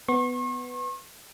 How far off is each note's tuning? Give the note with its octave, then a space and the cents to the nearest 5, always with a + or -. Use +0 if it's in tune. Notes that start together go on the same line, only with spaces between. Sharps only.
B3 +10 C#6 -45